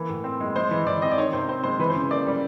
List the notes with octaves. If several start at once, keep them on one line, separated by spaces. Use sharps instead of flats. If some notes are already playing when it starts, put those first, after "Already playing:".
Already playing: E3 A#3
A2
C4
G#3
G#3 C5
E3
E3 D5
C4 D#5
D5
D#3 C#5
C3 C5
C4 C5
G#3 C5
E3 B4
C5
C#3
A#3 D5
G3